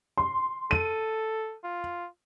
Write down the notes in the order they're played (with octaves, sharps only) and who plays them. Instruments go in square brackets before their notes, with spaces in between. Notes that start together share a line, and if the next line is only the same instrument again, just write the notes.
[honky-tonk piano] C6
[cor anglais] A4 [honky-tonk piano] D#7
[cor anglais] F4